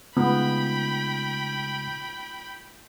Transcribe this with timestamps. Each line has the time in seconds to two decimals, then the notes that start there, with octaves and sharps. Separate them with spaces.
0.17 C#3 G#3 A3 B3 D#4 F4 G5 B5